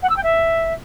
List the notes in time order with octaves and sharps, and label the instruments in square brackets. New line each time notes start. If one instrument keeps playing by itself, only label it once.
[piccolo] F#5
E6
G5
E5